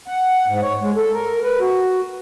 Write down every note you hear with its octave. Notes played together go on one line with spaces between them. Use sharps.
F#5
G#2
C#5
G#3
A4
A#4
B4
F#4